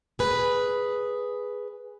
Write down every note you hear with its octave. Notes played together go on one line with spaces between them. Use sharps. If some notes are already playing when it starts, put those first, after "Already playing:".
G#4 B4